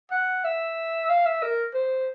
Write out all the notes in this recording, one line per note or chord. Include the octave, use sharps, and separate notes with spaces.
F#5
E5
F5
E5
A#4
C5